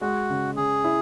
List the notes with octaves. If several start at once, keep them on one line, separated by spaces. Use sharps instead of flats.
G#3 F#4
C#3
C#3 G#4
E4